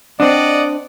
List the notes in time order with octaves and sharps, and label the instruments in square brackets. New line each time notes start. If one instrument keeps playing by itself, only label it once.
[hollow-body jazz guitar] C4 D4 [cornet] D5 [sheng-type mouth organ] D#5 F#5